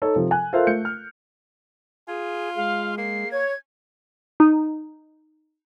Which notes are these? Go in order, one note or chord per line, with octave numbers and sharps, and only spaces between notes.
D#4 A4 C#5
C3 F3
G#5 F#6
F4 A4 A#4 C5 E5 F5
A3 G6 C#7
F6
F4 G#4 G#5
G#3 F5
A#3 C7
C#5 G#6
D#4